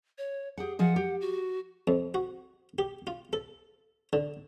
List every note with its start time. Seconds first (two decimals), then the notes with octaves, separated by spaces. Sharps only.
0.18 C#5
0.58 G4 G#4 F#5
0.79 F3 G#4 D#5 F#5
0.96 G4
1.21 F#4
1.88 F2
2.14 F#4
2.79 G4
3.07 F4
3.33 A4
4.13 D3